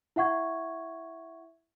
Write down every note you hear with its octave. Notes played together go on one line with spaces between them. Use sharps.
E4 E5 F#5 C#6 G#6